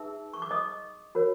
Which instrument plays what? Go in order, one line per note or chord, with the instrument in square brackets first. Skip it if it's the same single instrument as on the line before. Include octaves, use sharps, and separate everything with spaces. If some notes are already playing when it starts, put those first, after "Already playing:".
Already playing: [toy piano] D#4 G#4 B4 E5 E6
C#6
D6
D#5 D#6
F#4 A#4 C#5